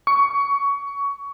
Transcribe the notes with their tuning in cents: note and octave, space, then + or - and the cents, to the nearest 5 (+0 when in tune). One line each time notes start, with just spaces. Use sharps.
C#6 +20